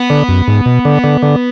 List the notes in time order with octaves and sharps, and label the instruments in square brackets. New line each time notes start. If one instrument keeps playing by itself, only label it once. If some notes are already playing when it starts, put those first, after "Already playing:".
Already playing: [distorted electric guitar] B3
[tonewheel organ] D3
F#2
G#2
B2
D3
D3
D3